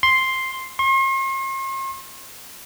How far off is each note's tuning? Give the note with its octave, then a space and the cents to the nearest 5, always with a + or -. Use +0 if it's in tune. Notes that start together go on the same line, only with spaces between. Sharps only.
C6 +5
C6 +45